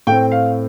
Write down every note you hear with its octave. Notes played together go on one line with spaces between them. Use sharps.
A2 A3 C4 G5
F5